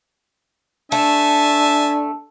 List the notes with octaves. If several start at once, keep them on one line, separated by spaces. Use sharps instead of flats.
A3 D4 E5 G#5 A5